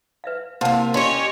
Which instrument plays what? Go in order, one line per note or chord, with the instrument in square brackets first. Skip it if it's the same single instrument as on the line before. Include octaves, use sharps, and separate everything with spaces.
[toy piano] B4 E5 F5
[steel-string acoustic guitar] C3 A#3 [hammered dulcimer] F4 [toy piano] C5 F#5 A5
[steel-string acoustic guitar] C#4 G4 [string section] C#5 D#5 [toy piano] C6